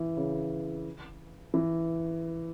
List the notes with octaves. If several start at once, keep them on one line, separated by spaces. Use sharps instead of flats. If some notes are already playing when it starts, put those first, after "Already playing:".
Already playing: E3
C#3
E3